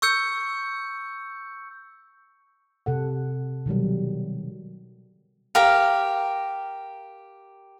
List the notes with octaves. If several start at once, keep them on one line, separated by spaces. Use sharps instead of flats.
C#6 E6 G6 C#7
C3 A4 F#5
B2 D#3 F#3 G3
G4 A#4 F5